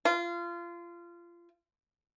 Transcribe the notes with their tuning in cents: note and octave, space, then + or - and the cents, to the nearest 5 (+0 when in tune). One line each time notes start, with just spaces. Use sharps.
F4 -25